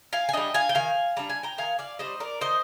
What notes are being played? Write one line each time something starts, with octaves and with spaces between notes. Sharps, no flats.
F5 G#5
G#5
G3 D4 D#5 G5
F5 G#5
G5
D#3 F5 G#5
G3 D4 A#5
G#5
G5 A#5
D#3 F5 G#5
D5 F5
G3 D4 C5 D#5
A#4 D5
D#3 C5 D#5